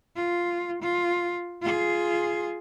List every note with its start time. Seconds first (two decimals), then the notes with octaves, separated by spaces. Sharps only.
0.16 F4
0.82 F4
1.62 F4 G#4